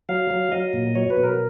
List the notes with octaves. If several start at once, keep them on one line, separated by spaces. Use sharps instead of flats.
F#3 F5
F#3
F#3 D#5
A#2
F#3 C#5
B4
B2
A#4